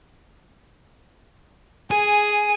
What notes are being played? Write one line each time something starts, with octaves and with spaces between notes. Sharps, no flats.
G#4 G#5